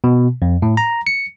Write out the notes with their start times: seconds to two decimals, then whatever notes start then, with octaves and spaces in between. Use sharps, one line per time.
0.04 B2
0.42 F2
0.62 A2
0.77 A#5
1.07 C#7